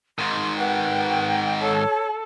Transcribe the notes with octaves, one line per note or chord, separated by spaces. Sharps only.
G#2 D#3 C6
B4 F#5 G5
A4 C#5